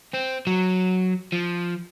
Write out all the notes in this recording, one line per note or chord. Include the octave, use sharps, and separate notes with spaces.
C4
F#3
F3